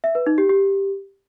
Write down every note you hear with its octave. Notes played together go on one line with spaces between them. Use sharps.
E5
B4
D#4
G4
G4